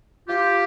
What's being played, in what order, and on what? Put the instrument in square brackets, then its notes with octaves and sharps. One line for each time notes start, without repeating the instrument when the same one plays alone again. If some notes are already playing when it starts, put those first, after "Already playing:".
[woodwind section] F4 G4